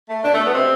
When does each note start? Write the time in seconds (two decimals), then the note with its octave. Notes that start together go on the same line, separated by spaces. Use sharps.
0.09 A3
0.23 B2 D4
0.33 A3
0.39 B2
0.45 B3
0.54 C3 C4